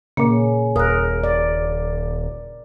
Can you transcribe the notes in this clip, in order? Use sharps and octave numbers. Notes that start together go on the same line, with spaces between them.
A#2 C#3 A#3
D#1 A#4 D#6 F#6
D5